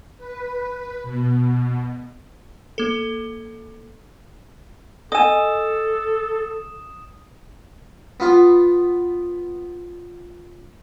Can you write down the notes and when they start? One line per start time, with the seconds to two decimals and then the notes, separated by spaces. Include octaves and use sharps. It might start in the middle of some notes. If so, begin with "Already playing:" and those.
0.18 B4
1.03 B2
2.78 A#3 A4
5.12 A4 D#5 G#5 D#6 E7
8.20 B3 F4